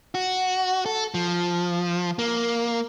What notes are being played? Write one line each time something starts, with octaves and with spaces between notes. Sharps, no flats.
F#4
A4
F3
A#3